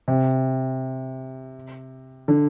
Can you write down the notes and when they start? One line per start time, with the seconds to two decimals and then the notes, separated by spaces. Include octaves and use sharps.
0.08 C3
2.28 D3